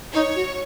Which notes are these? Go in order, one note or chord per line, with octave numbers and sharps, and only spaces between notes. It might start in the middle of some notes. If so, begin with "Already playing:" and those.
D#4 C#5
F#4